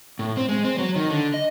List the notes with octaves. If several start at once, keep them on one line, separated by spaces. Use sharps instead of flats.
A2
C4
G#3
C4
F#3
D#3
D3
D#5